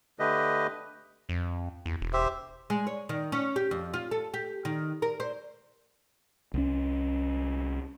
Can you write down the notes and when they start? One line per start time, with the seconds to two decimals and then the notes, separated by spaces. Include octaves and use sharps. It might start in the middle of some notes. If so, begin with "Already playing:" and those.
0.19 D3 A3 G4 B4 D#5
1.29 F2
1.86 E2
2.01 E1
2.13 G4 C5 E5
2.70 G#3
2.87 C#5
3.09 D#3
3.32 C#4
3.56 G4
3.71 F2
3.94 F4
4.11 A4
4.34 G4
4.65 D#3
5.02 A#4
5.20 C5
6.54 C2 C#4